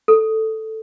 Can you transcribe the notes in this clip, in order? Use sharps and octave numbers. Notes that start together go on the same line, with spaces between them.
A4